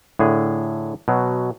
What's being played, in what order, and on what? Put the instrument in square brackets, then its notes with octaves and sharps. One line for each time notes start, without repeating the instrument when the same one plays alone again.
[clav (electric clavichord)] A2 D3 G#4
B2 F#3